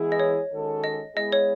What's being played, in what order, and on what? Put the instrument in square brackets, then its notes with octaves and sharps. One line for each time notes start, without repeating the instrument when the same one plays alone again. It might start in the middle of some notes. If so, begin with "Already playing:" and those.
Already playing: [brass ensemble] E3 G#3 B3 E4 G#4
[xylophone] D#5
C#5
[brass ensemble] D#3 G#3 C#4 F#4 A4
[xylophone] D#5
[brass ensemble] G#3 B3 E4 G#4 [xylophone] D#5
[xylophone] C#5